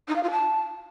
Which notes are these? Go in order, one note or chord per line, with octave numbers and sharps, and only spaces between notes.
D#4
F5
F4
A5